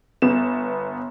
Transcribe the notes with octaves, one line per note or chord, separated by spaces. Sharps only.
G1 B3 E7